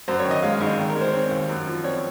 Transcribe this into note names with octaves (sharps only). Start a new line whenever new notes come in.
F#2 C5
C#5
D#3
D#5
G#3 F5
F5
G#1
D#5
D#3
A#4
G#3
C5
C4 C#5
D#2
F#2
F3
C4 C#5